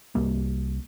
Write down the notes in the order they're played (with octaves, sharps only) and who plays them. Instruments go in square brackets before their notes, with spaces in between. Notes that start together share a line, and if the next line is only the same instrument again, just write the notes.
[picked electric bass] C2 G3 A#3